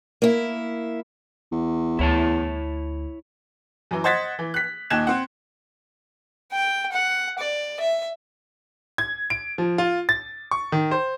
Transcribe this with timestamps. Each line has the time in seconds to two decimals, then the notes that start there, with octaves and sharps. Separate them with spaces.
0.22 A#3 E4
1.52 E2
1.99 D2 E4 C#5 A5
3.91 F#2 E3
4.04 C5 D#5 F#5 G#6 A6 B6
4.39 E3
4.54 F#6 B6
4.90 D#2 A#2 D#4 F#6 G#6 E7
5.07 C4 F#5
6.52 G5
6.92 F#5
7.39 D5
7.80 E5
8.98 G#6
9.30 D7
9.58 F3
9.78 F4
10.09 A6
10.51 C#6
10.72 D#3
10.91 C5